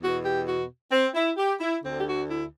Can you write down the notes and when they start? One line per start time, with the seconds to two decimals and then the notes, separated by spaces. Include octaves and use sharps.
0.01 E2 B2 F#4
0.24 G4
0.47 F#4
0.92 C4
1.15 E4
1.37 G4
1.60 E4
1.83 D2 D3 C4
2.01 G4
2.06 F#4
2.28 E4